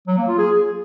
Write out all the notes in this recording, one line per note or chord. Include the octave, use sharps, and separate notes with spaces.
F#3
A#3
F4
G#4